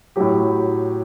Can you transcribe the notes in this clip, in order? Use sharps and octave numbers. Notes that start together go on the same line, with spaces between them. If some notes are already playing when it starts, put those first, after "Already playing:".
A2 F#3 G4